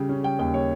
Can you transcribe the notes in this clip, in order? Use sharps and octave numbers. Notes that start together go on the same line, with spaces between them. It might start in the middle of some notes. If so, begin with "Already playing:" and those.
Already playing: C#3 G3 G5
C#4
G3 G5
D#2 G5
G3 C#5